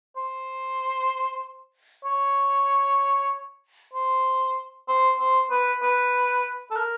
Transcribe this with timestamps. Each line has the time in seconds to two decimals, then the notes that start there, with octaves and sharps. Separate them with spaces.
0.16 C5
2.05 C#5
3.93 C5
4.88 C5
5.19 C5
5.51 B4
5.83 B4
6.71 A4
6.76 A#4